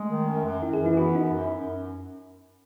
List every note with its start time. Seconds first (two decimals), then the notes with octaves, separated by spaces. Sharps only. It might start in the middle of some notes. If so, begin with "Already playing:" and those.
Already playing: G#3 A3
0.09 D#3
0.27 F#2
0.45 F#2
0.62 F#2 E4
0.73 G#4
0.80 E3
0.86 E4
0.97 B3 F#4
1.15 F#2 D#4
1.32 F#2
1.50 F#2